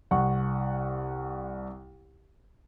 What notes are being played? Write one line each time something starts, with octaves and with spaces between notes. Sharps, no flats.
C2 F#5 C#6